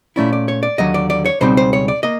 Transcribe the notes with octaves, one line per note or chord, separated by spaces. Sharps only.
A#2 F3 A3 C#4 E4 D5
D5
C#5
D5
D#2 D3 F#3 D#5
D5
D5
C#5
C#2 B2 G3 C4 D#4 C5
C5
C#5
D5
A#3 D#5